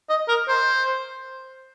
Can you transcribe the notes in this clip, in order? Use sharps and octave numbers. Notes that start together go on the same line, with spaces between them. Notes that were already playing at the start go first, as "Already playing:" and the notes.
D#5
A#4
C5